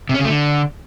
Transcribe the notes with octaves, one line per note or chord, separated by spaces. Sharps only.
C3
C#4
C#3
A3
D3